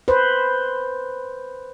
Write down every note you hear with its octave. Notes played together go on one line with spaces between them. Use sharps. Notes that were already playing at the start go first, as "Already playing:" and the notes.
B4 C5